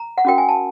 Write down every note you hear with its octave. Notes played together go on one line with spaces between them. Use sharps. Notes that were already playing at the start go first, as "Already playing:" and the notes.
Already playing: A#5
F#5
C#4 F#4 A#4 G5
G#5
A5